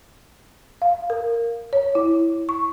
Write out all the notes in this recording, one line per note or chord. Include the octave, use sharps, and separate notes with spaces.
F5
A#4
C#5
E4
C#6